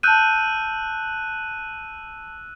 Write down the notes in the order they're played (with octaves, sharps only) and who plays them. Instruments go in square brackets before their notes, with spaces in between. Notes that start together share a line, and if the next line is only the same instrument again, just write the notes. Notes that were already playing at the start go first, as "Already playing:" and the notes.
[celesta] A5 G6 [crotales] E6 F#6 D#7